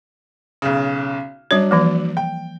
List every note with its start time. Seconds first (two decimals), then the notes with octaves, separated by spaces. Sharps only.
0.62 B1 C#3
1.51 F#3 G3 D4 C#5
1.71 E3 F3 A#3
2.17 G5